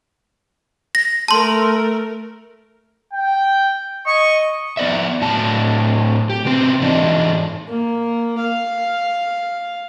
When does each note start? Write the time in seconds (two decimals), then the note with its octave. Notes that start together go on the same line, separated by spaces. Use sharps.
0.95 A#6
1.28 A3 A#4 A5 C6
3.13 G5
4.07 D#5 C#6
4.77 B3 D5 E5
5.21 A2 F#3 A5
6.30 G4
6.45 C3 B3 C4
6.82 G#2 E3 D4 D#4
7.68 A#3
8.38 F5